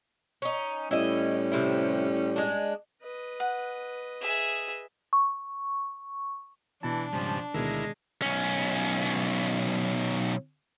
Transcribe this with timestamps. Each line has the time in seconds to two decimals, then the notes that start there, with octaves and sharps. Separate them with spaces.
0.42 C#4 D#4
0.91 A2 G3 C#4 E4 D#5
1.52 C3 F3 E4
2.36 G#3 D4
3.03 B4 D#5
3.40 F#5
4.22 G#4 E5
5.13 C#6
6.83 B2 E3 D4 A5
7.13 G#2 C#3 F3 G3
7.54 D2 B2 D#3 G#3 E4 A#4
8.22 B1 C#4